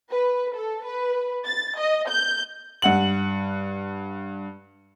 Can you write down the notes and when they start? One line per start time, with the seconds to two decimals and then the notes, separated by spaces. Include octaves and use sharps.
0.11 B4
0.54 A4
0.85 B4
1.46 A6
1.79 D#5
2.09 G6
2.82 G2 F#5 F#7